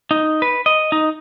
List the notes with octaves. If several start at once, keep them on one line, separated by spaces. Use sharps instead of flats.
D#4
B4
D#5
D#4